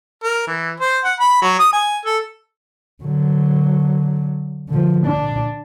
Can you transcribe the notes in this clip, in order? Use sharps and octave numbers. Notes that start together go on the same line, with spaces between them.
A#4
E3
C5
F#5
B5
F#3
D#6
G#5
A4
D3 F#3
D3 F3
D4